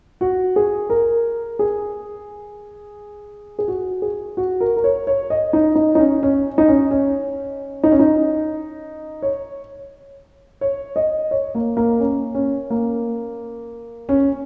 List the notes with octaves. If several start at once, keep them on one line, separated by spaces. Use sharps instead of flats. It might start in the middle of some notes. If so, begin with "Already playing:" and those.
F#4
G#4
A#4
G#4
G#4
F#4
G#4
F#4
A#4
A#4
C#5
C#5
D#5
D#4
D#4
D#4
C#4
C#4
D#4
C#4
C#4
D#4
C#4
D#4
C#5
C#5
D#5
C#5
A#3
A#3
C#4
C#4
A#3
C#4